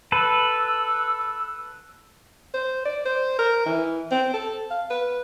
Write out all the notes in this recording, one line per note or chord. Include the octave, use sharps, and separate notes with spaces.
A4 B4 E6
C5
D5
C5
A#4
E3
C4
A4
F5
B4